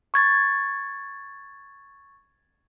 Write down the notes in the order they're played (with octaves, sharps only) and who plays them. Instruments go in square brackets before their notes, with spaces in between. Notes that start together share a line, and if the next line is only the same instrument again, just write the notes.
[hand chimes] C#6 G#6 A6